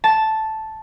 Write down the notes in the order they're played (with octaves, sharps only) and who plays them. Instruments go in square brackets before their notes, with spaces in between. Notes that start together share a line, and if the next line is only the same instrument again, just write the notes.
[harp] A5